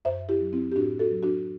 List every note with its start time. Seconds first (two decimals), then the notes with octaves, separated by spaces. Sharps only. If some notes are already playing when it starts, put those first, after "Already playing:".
0.05 F#2 C5 E5
0.29 E4 G4
0.41 F#3
0.53 C4 E4
0.72 G4
0.76 A2 D4 F#4
0.99 F#4 A4
1.11 F#3
1.23 D4 F#4